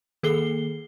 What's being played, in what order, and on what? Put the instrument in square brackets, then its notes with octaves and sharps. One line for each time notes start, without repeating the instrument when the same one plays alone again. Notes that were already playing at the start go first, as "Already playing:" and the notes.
[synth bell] D#3 A#3 G#4 A4 C7 G7